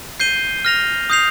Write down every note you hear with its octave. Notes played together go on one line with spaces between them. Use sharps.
G6 C7 D#7 G7
F6 A#6 F7
D#6 G6 C7 F7